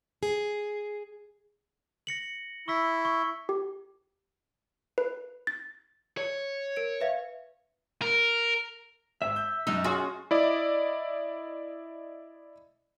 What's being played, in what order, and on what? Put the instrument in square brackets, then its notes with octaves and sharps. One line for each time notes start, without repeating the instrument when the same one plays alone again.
[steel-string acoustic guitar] G#4
[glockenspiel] A#6 C#7 F#7
[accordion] E4 [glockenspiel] C#6 E6 B6
[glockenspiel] C#6
[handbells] G4
B4
A6
[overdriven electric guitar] C#5
[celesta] A#4 D7
B4 E5 F5
[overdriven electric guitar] A#4
[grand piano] G#1 [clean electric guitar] E5
[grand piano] G6
[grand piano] F#2 E6 [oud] D#4
[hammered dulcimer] C#4 F4 D#5 [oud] F#4 [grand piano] G#4 C6
[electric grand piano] E4 D5 D#5